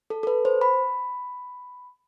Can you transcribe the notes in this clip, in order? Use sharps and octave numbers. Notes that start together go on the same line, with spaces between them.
A4
A4
B4
C5
B5